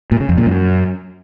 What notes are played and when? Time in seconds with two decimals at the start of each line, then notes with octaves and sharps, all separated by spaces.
0.12 A#2
0.20 C#3
0.29 F2
0.38 A#2
0.46 F#2